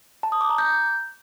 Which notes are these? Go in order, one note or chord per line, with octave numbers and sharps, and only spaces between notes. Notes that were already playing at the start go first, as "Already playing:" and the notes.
A5
D#6
D6
A#5
G6